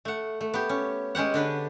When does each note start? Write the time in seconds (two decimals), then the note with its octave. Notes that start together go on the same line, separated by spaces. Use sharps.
0.05 A3 F#5
0.41 A3
0.54 B3 G4
0.69 C#4
1.15 G#3 C#4 G4 F#5
1.34 D3 D4 B4